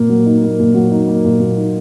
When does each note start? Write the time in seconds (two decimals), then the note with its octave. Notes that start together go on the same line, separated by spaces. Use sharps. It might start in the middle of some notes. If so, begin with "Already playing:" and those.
Already playing: A#2 A#3
0.09 F#3
0.26 D#4
0.43 A#3
0.59 A#2
0.74 F#3
0.91 D#4
1.08 A#3
1.24 A#2
1.40 F#3
1.56 D#4